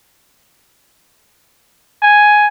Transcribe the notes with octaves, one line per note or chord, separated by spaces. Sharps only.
G#5